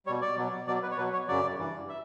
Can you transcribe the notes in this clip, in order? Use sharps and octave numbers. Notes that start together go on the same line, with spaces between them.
B2 G3 C#5
D5
B2 F#3
B2 F#3 D5
B4
C#5
B2 F#3 B4
C#5
F#2 C#3 F#3 D5
G2 E3 G3
E5